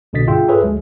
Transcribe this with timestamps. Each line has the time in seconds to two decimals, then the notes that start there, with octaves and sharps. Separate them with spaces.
0.13 C2 B2 D3 D#5 A6 B6
0.27 G2 F4 G#4 E5 G5 C6
0.48 G#4 A4 B4 C#5 E5 G#5
0.62 D2 F#3 G#3